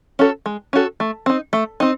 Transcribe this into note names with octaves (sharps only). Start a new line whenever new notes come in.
C#4 F#4 A4
G#3
C#4 F#4 A4
A3
C4 D#4
A3
C4 D#4